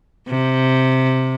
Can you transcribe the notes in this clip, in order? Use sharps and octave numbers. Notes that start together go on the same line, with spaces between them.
C3